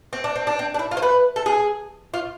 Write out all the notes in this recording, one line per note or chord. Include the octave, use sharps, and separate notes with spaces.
C4
D4
C4
D4
C4
D4
E4
F4
C5
B4
A4
G#4
F4